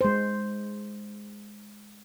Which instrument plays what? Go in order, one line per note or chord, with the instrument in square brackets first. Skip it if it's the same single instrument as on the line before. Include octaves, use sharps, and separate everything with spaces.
[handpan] G#3 C5